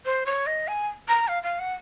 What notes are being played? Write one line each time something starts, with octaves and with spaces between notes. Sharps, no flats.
C5
C#5
D#5
G#5
A#5
F5
F5
F#5